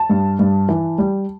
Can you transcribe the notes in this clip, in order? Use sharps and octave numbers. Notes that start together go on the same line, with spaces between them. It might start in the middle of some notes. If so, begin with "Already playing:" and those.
Already playing: A5
G2
G2
E3
G3